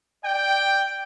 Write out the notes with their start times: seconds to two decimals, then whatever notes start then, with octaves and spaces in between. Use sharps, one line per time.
0.25 D5 G5